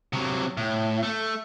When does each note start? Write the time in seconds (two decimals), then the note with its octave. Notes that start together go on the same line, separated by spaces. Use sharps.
0.13 C3 F#3
0.57 A2
1.03 A3